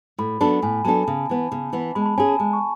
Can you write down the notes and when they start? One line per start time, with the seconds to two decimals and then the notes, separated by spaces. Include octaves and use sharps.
0.18 A2 B5
0.41 F#3 B3 D4 A4 B5
0.62 A2 G#5
0.85 F#3 B3 D4 A4 A5
1.07 C#3
1.30 E3 B3
1.52 C#3
1.73 E3 B3
1.95 G#3 B5
2.02 A5
2.06 B5
2.18 C#4 G#4 G#5
2.29 A5
2.39 G#3 A5
2.53 C#6